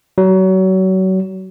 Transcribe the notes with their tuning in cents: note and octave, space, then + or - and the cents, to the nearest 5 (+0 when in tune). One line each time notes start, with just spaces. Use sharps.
F#3 +30